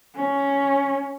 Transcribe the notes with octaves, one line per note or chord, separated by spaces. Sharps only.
C#4